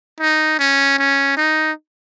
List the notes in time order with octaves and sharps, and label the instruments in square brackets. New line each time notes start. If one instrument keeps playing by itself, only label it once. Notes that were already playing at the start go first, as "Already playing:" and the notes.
[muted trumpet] D#4
C#4
C#4
D#4